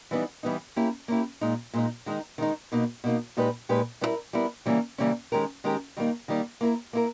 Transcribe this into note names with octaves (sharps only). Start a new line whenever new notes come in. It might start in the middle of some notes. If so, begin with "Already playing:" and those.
E3 G3 B3 D#4
E3 G3 B3 D#4
A#3 C#4 E4 G4
A#3 C#4 E4 G4
A#2 G#3 D#4
A#2 G#3 D#4
D#3 G#3 D#4
D#3 G#3 D#4
B2 A#3 D#4
B2 A#3 D#4
A#2 G#3 D#4 G4 B4
A#2 G#3 D#4 G4 B4
G3 B3 E4 A#4
G3 B3 E4 A#4
C#3 E3 G3 A#3 C#4
C#3 E3 G3 A#3 C#4
D#3 G#3 C#4 G4 A#4
D#3 G#3 C#4 G4 A#4
D#3 G3 A#3 D#4
D#3 G3 A#3 D#4
A#3 E4 A#4
A#3 E4 A#4